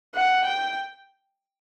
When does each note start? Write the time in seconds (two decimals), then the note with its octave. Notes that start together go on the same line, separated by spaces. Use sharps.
0.15 F#5
0.44 G5